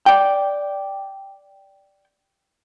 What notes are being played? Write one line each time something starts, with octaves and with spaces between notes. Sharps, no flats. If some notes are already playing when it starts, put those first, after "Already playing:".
D5 G5